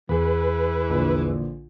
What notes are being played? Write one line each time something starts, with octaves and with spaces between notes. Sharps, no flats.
E2 E3 G#4 B4
A#1 D3